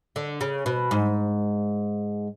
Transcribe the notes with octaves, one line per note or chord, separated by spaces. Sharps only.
D3
C#3
B2
G#2